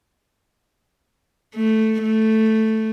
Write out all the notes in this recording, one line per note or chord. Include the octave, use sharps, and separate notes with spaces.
A3
A3